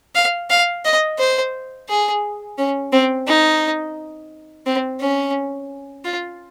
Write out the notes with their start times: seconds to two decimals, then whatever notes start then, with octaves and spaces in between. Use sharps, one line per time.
0.15 F5
0.50 F5
0.85 D#5
1.19 C5
1.89 G#4
2.58 C#4
2.92 C4
3.27 D#4
4.66 C4
5.00 C#4
6.04 F4